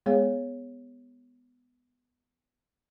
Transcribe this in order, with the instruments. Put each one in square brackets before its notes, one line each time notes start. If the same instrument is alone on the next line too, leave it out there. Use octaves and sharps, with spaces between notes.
[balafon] G#3 B3 G#4 C#5 F5